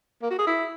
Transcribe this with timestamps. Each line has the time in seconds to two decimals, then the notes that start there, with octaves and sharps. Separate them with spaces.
0.22 A#3
0.30 F#4
0.39 G#4
0.47 E4